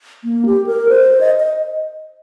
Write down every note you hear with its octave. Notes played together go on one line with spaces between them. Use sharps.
A#3
G4
A#4
C5
D#5
D#5